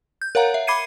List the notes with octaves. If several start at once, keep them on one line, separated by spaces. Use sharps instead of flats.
G6
A#4 C#5 F5 F#5 A#5
E5
B5 D6 G#6 C7 C#7 D#7